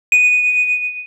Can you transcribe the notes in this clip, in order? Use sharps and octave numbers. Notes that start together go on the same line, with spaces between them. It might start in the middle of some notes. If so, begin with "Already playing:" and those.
D#7